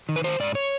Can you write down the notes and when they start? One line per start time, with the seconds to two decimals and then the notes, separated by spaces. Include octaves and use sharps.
0.09 D#3
0.16 B4
0.24 D#3 C5
0.40 G#2 D5
0.55 C#5